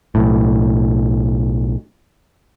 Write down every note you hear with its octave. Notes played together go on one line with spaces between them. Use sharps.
B1 A2